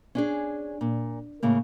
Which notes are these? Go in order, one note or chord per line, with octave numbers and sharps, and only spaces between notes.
C#4 D4 G#4
A#2
A2 C#3 A#3